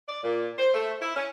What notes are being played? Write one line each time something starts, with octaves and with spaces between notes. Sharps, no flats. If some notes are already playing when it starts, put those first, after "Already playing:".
D5
A#2
C5
A3
E4
C#4